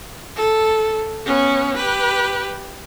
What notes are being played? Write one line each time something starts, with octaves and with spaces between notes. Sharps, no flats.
A4
B3 C#4
G4 B4